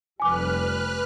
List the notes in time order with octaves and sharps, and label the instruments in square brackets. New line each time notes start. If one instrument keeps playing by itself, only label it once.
[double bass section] F1 G3 [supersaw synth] B4 F6 F#6 [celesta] G#5 D6